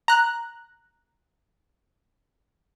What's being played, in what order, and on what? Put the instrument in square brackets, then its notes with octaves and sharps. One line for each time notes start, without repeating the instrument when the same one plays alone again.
[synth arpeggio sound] A#5 F#6